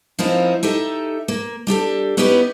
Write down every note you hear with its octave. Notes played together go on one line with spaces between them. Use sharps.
F3 A#3 C4 C#4 D#4 E4
D#4 G4 A4 E5
A#3
G3 D4 G4 A4
B3 C#4 D#4 E4 G4 B4